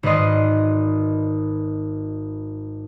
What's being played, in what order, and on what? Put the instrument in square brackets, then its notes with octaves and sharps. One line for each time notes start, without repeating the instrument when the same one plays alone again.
[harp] G#1 B4 D5 D#5 C6